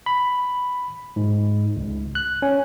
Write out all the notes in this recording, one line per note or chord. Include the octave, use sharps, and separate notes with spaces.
B5
G#2
C#2
F#6
C#4